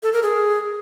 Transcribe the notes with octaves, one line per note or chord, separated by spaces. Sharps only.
A4
A#4
G#4